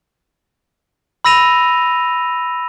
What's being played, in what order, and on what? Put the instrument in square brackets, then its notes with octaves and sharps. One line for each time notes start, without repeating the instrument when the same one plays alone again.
[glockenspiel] B5 E6 A#6 D#7 F7